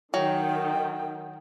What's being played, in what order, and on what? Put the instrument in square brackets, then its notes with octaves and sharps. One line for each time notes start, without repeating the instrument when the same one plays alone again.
[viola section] D#3 [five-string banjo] F#3 [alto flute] G5